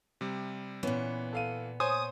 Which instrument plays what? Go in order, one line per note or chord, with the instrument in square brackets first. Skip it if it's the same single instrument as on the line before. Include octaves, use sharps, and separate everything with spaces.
[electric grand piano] C3 G3
[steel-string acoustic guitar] A#2 B3 [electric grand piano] E3 [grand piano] C#4
[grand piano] A4 F5 D#7
[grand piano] C5 C#5 [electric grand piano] G#5 [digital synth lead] D#6